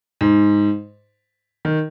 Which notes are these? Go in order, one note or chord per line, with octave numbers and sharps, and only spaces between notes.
G#2
D#3